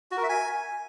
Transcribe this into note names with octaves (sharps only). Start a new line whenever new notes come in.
F#4
A#4
E5
G#5